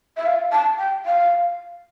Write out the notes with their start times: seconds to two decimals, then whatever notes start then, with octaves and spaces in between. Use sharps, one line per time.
0.17 E5
0.26 F5
0.52 A5
0.78 G5
1.05 F5